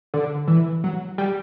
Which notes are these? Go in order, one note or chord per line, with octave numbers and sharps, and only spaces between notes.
D3
E3
F#3
G3